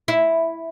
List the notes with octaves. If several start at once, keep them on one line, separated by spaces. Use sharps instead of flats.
E4